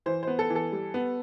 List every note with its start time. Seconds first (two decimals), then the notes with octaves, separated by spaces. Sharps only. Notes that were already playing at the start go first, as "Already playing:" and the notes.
0.06 E3 C5
0.23 B3 C5
0.39 A4
0.50 E3
0.55 A4
0.72 G3
0.94 B3